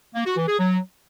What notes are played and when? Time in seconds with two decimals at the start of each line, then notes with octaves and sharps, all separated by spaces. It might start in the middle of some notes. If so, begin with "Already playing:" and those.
0.15 A#3
0.26 F#4
0.37 E3
0.48 G#4
0.59 F#3